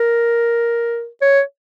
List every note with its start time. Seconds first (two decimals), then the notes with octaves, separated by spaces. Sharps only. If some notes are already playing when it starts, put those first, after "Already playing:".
Already playing: A#4
1.22 C#5